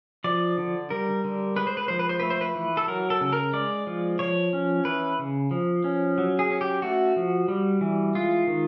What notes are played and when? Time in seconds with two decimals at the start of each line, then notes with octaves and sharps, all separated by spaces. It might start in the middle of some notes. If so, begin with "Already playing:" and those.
0.24 F3 D5
0.58 D3
0.90 G3 A#4
1.24 D3
1.56 G#3 B4
1.67 C5
1.77 B4
1.88 F3 C5
1.99 B4
2.09 C5
2.20 A3 B4
2.30 C5
2.41 B4
2.55 E3
2.77 A4
2.88 F#3 A#4
3.10 A4
3.21 C#3
3.33 A#4
3.53 G#3 D5
3.87 F3
4.19 F3 C#5
4.53 C#4
4.85 E3 B4
5.19 C#3
5.51 F3
5.84 C#4
6.18 F#3
6.39 G#4
6.50 C#4
6.61 G4
6.82 A3 F#4
7.16 F3
7.48 G3
7.81 E3
8.15 G#3 F4
8.47 D#3